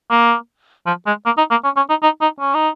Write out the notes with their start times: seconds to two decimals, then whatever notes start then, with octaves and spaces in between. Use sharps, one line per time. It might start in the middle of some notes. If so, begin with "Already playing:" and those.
0.11 A#3
0.87 F3
1.07 G#3
1.26 A#3
1.38 D#4
1.51 A#3
1.64 C#4
1.77 C#4
1.90 D#4
2.03 D#4
2.22 D#4
2.40 C#4
2.55 D#4